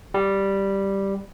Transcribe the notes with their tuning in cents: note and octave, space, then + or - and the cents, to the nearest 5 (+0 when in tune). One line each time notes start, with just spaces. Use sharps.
G3 +0